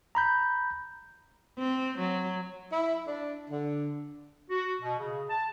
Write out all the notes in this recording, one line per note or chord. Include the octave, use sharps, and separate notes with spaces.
A#5 B5 G6
C4
F#3
E4
D4
D3
F#4
B2
C#3
A5